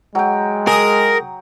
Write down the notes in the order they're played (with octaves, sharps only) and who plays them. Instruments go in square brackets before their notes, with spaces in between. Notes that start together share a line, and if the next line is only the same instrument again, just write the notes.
[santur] F#3 G5 [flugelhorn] G#3
[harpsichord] G#4 D#6 [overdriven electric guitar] A#4